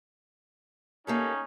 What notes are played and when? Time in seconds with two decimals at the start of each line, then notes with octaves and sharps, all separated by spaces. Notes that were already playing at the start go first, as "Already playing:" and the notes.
1.07 A#3 C#4 D#4 G4 A4